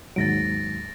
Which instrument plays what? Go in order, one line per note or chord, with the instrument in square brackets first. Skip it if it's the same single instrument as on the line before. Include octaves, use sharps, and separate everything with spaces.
[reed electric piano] D#2 G#2 F#3 [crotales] A6 A#6 D7